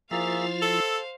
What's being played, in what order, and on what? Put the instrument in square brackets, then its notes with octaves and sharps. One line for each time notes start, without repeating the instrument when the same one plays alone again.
[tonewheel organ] F3 E4 F4 [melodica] A#3 G#4 E5 [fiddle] C5 F5
[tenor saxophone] A4 [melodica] E6